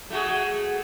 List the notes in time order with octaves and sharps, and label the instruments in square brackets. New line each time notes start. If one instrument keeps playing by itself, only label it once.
[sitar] A3 F#4 G#4